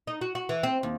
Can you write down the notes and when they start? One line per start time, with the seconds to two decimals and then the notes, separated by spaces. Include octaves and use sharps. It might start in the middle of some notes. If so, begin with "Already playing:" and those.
0.07 D#4
0.21 F#4
0.35 F#4
0.49 E3
0.63 C4
0.83 D#2